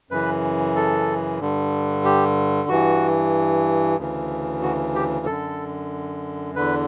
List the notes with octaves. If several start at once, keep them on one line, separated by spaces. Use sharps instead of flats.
F#2 C#3 E3 B4
A4
G2 D3
G4
G2 E3 F#4
D2 C#3 E3
F#4
G4
F#2 D3 A4
E2 D3 B4